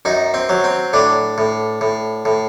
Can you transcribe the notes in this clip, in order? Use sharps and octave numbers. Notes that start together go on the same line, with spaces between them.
F#2 D#4
C4
F#3
C4
A2 D4
A2
A2
A2